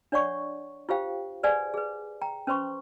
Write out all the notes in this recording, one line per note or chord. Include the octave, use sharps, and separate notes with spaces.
D4 C#5 D5 F#5 C#6
F4 G4 C5 F5 G5
G#4 B4 C5 D5 F#5 G#5
G#4 B4
G5 A#5
C#4 B4 C5 C6 C#6